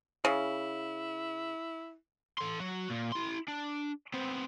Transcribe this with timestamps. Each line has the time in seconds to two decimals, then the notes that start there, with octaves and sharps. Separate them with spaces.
0.25 C#3 E4
2.38 A4 C6
2.60 F#3 F#4
2.90 A#2
3.12 E4 C6
3.48 D4
4.14 B3 C4